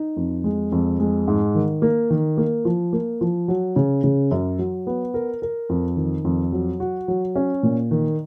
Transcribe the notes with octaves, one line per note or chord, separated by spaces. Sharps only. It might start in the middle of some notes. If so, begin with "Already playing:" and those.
Already playing: D#4
F2
G#3
F2
G#3
G#2
D#3
A#3
D#3
A#3
F3
A#3
F3
F#3
C#3
C#3
F#2
F#3
B3
A#4
A#4
F2
D#3
F2
F#3
F#4
F#3
C#4
A#2
D#3